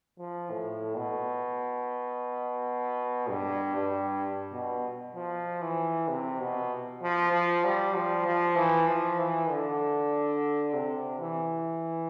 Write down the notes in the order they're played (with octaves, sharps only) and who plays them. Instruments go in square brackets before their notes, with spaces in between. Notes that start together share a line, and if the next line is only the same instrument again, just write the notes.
[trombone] F3
A2
B2
G2
G2
B2
F3
E3
C3
B2
F3
F3
G3
F3
F3
E3
F3
E3
D3
C3
E3